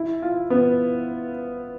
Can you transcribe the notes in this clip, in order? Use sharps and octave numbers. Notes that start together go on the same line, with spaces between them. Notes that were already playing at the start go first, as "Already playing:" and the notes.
Already playing: E4
F4
B3